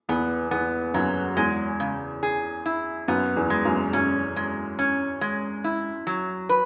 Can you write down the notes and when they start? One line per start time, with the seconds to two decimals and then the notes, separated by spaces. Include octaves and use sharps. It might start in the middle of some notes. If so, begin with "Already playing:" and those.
0.09 E2 B3
0.51 E2 B3
0.94 F#2 F#3
1.37 E2 G#3
1.80 C#3
2.23 G#4
2.66 E4
3.08 F#2 B3
3.36 E2
3.50 G#3
3.65 F#2
3.93 F#2 C#4
4.36 G#3
4.79 C#4
5.21 G#3
5.64 E4
6.07 F#3
6.49 B4